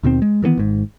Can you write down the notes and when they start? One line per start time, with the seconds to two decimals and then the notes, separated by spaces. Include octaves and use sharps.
0.03 D#2 B2 D#3 C4
0.22 G#3
0.42 D#3 E3 G3 B3
0.58 G#1 G#2